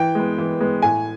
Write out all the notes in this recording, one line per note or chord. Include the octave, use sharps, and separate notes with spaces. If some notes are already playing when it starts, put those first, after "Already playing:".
Already playing: E3 G5
G#3 B3
E3
G#3 B3
A2 G#5